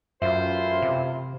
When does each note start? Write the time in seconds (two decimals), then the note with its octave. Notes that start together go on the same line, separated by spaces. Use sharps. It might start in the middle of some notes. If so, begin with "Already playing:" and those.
0.22 A1 F#2 E4 F4 C5 E5
0.82 C3